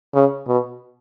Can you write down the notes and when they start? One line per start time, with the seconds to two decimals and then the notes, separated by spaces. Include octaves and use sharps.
0.15 C#3
0.48 B2